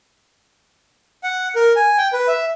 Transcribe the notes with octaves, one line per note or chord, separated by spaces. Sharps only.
F#5
A#4
G#5
G5
B4
E5